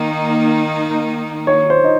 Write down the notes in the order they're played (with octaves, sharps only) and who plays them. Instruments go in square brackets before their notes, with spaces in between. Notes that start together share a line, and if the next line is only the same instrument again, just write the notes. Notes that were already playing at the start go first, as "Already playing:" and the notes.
Already playing: [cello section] D#3 A#3 D#4
[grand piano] C#5
C5
D#4